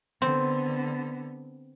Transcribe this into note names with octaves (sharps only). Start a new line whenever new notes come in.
D3 B3 C4